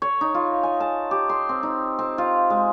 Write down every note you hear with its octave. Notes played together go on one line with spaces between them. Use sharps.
C#5
D#4
F4
G#5
A5
G4
C6
C4
D#4
C4
F4
G#3